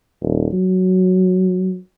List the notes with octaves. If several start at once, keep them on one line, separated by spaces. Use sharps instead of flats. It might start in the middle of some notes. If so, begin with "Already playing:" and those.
D#1
F#3